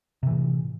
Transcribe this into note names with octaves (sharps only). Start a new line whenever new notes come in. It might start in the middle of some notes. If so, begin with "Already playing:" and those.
A2 C3 E3